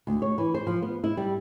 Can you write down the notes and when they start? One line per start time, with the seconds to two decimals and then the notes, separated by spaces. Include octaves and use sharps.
0.07 D2
0.22 C#5
0.38 E3
0.54 C5
0.67 F3
0.82 B3
1.04 E4
1.17 G3